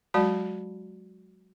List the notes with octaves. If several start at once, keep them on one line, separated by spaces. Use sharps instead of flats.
F#3 G#3 F#4 D5 A5 B5